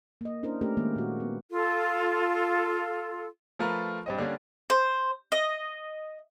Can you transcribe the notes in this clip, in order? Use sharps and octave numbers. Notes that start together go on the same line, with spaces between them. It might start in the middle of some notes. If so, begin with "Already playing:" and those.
A#3 D#5
C#4 D4 E4 A#4 C5
A3 A#3 C#4 G4 A#4
D#3 G#3 A#3
A#2 F#4
B3
F4 A4
F3 A3 F4 A#4 B4
G2 C4 D#5
D3 G3 A#3 C#4 D4
C5
D#5